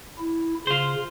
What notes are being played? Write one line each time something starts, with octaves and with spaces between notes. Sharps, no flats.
E4
C#3 F4 C5